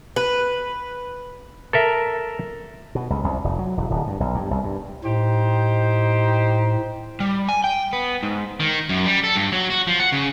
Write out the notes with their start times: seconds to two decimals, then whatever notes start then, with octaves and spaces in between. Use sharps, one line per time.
0.16 B4
1.73 A4 A#4 E5
2.95 B2
3.10 C#2
3.24 C2
3.44 F1
3.59 F#3
3.77 E1
3.90 D1
4.07 G2
4.20 B1
4.35 G2
4.51 C2
4.64 G2
5.04 A2 D#4 G4 C5
7.20 G3
7.49 G#5
7.64 G5
7.93 B3
8.23 G#2
8.60 D#3
8.89 F#2
9.06 G3
9.24 A4
9.36 G2
9.52 F#3
9.70 F#4
9.87 F3
10.00 F#5
10.12 C#3